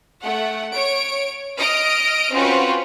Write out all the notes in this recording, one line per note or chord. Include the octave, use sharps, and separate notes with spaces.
A3 F#5
C#5 D7
D#5 D#6 F6 D7
C4 C#4 F4 F#4 B4